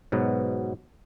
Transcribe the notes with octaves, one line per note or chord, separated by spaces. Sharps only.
G#2 B2 F#3 B3